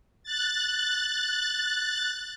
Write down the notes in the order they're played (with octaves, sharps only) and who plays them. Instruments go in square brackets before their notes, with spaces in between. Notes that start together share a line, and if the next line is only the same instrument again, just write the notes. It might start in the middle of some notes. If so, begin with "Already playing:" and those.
[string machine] F#6 A6